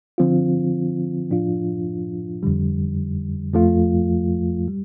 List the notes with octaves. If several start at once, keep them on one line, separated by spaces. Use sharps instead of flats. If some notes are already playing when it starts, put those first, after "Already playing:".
D3 F3 C4 F4
A2 F3 D4 F4
F2 D3 G3
F2 F3 A3 F4
G3